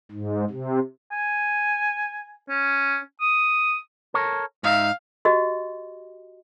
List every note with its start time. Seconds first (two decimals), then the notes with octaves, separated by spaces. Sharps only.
0.12 G#2
0.50 C3
1.12 G#5
2.50 C#4
3.21 D#6
4.14 A4 A#4 C#5
4.63 G#2 D#4 E5 F5
5.25 F#4 G4 D#5